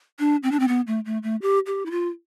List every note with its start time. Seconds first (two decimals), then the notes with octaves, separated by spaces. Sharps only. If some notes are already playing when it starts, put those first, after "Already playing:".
0.19 D4
0.43 C4
0.51 D4
0.59 C4
0.68 B3
0.87 A3
1.05 A3
1.23 A3
1.42 G4
1.66 G4
1.86 E4
1.91 F4